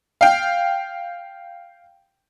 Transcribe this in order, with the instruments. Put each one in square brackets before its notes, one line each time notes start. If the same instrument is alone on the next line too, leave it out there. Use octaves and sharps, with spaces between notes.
[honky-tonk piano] F5 G5